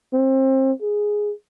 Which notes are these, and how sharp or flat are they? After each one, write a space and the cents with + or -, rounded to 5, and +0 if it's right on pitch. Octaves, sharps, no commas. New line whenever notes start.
C4 +30
G#4 +0